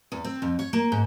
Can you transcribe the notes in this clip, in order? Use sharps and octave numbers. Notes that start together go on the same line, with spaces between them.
E2
C4
F2
C#5
A#3
G#2